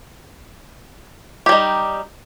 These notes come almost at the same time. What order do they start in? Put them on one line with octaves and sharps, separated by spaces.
G4 G3 D#4